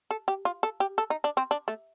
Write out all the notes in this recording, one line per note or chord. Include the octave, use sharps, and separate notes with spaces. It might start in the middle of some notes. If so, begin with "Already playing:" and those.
A4
G4
F4
A4
G4
A4
D#4
D4
C4
D4
A3